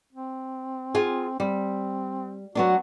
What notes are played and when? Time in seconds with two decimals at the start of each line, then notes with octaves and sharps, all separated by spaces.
0.13 C4
0.94 F4 G#4
1.40 G3 C4
2.55 F#3 B3 D4 F#4